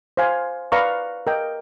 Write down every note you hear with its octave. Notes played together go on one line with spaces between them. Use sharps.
C5 F5 G#5
B4 D5 F5 A#5 C#6
A#4 D#5 G5